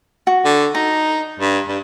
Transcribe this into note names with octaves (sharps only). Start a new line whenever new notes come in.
F#4
D3
D#4 A#5
G2
G2